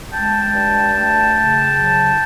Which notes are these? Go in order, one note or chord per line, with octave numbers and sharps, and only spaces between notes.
G#3 G5 A5
G2
A3
C#3
F#3